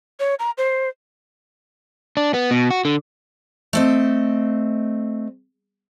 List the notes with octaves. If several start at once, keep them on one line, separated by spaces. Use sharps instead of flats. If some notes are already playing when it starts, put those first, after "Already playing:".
C#5
A#5
C5
D4
B3
B2
F#4
D3
A3 C4 D#5